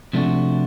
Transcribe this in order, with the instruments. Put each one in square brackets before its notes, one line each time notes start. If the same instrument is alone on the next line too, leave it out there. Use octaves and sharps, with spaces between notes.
[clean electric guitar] C3 F3 A3 D4 F#4